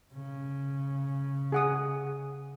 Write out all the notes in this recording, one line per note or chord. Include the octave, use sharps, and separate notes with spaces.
C#3
G#4 F#5 D#6